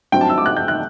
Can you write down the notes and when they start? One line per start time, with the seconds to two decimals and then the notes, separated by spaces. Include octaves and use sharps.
0.12 G2 F#3 C4 G5
0.21 A5
0.29 E6
0.38 D6
0.46 F#6
0.57 G6
0.68 F#6